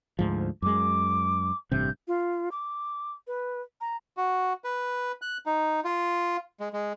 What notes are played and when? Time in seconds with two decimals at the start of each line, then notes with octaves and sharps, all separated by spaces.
0.19 D2 G#2 F3
0.62 F#2 G#3 D6
1.72 A1 G2 C3 G6
2.08 F4
2.52 D6
3.27 B4
3.81 A#5
4.17 F#4
4.64 B4
5.22 F#6
5.46 D#4
5.85 F4
6.60 G#3
6.73 G#3